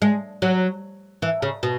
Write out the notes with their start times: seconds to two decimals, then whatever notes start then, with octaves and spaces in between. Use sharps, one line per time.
0.02 G#3
0.42 F#3
1.22 E3
1.42 C#3
1.63 B2